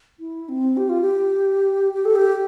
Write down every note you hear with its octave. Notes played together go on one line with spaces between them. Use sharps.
E4
C4
G4
F4
G4
G4
A4
G4